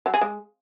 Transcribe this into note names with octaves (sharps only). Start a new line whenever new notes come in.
F#3
G#4
G#3